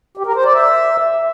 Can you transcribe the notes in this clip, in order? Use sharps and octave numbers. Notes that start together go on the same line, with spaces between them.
G4
A#4
C5
D5
E5